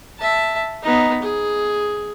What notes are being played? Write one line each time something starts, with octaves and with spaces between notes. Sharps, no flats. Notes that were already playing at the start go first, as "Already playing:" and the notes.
E5 A5
B3 D#4
G#4